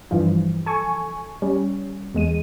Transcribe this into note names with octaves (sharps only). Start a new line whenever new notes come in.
G2 E3 F3
A4 G#5 C#6
G3 C#4
E2 G#3 D#7